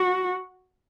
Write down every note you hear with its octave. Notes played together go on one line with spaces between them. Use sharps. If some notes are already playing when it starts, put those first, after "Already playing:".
Already playing: F#4